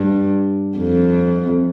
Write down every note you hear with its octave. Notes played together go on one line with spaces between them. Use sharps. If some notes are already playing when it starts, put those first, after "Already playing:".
Already playing: G2
F2